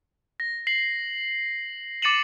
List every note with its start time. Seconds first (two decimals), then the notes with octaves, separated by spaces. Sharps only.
0.40 A#6
0.67 C7 F#7
2.02 D6 A6 C#7 D#7 E7 F#7